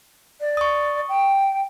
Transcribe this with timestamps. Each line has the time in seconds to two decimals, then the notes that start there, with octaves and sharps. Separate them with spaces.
0.40 D5
0.57 C#6 D#6
1.08 G5